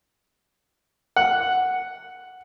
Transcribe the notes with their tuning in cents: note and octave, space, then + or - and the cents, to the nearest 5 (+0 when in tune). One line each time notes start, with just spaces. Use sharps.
F#5 +0